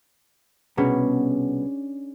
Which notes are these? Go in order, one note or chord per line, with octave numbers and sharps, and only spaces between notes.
C2 B2 B3 C#4 D4 G#4